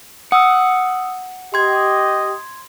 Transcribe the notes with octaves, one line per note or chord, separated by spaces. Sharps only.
F#5 D#6 E6
G4 D#5 C6 G#6